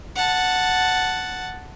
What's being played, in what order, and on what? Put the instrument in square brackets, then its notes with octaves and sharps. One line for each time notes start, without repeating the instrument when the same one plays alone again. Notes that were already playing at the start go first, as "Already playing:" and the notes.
[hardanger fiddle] F#5 A5